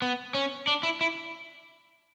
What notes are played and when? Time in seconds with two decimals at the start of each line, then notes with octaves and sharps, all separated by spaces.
0.02 B3
0.34 C#4
0.67 D4
0.83 E4
1.01 E4